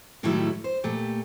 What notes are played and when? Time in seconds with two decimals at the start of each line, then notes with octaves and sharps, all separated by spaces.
0.23 A2 D#3 F#3 G3 A3 E4
0.64 C5
0.84 A#2 A3 G4